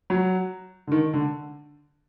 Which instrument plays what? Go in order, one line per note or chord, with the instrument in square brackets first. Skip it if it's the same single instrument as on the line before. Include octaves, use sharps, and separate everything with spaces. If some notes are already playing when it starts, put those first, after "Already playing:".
[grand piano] F#3
D3
D#3
D3